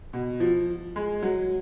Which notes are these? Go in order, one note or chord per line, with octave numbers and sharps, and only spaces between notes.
B2
F3
G#3
F#3